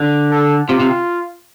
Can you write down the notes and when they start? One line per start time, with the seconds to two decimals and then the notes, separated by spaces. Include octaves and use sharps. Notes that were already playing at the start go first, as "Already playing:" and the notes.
Already playing: D3
0.31 A4
0.69 C3 F4
0.80 C3